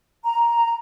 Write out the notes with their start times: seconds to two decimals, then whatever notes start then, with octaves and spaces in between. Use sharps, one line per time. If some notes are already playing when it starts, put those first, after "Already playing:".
0.24 A#5